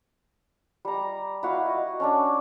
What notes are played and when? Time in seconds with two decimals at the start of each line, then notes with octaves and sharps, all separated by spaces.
0.85 G3 A#5
1.43 E4 F#4 F5
1.66 F#4 D#5
2.00 C#4 D4 D5